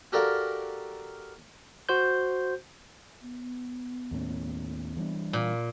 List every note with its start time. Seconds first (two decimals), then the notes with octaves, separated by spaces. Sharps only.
0.12 F#4 G4 A4 A#4 D5 F5
1.89 F#4 C5 G6
3.22 B3
4.11 D#2 A2 C#4
4.96 E3 G3 D4
5.33 A#2